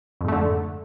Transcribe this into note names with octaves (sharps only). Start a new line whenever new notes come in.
F2 G#2 D3 A3